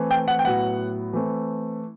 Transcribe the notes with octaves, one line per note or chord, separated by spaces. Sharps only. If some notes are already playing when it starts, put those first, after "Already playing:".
Already playing: E3 A3 C4
G5
F#5
G5
A2 F#3 B3 F#5
E3 A3 C4